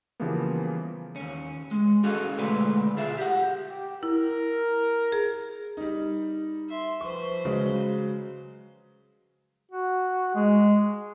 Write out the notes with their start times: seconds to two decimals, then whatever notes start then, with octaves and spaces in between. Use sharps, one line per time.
0.20 C#3 E3 F3 G3 A#3 B3
1.16 D#2 C#4
1.71 G#3
2.04 C#4 F#4 G#4 A4 D#5 F5
2.38 D2 B2 G#3 A3 B4 D5
2.96 B1 B2 F4 G#4 E5
3.18 G4 F#5
3.69 G4
4.03 E4 A#4
5.12 G#4
5.77 G3 D#4
6.69 E5 C6
7.01 F3 B4 C5 C#6
7.45 C#3 F#3 G#3
9.71 F#4
10.35 G#3